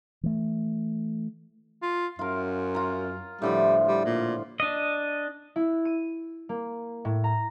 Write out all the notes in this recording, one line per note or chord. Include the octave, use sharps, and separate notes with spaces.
E3 A3
F4
F#2 F4 A#4
F4 A#5
A2 D3 F3 G3
G3
A#2
D4 D#5
E4
D#7
A#3
A2
A#5